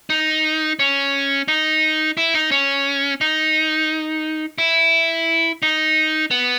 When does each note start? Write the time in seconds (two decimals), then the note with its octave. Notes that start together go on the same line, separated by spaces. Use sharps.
0.10 D#4
0.79 C#4
1.48 D#4
2.17 E4
2.34 D#4
2.51 C#4
3.21 D#4
4.58 E4
5.63 D#4
6.31 B3